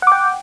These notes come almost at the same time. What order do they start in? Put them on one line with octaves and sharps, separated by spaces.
F#5 D6 G5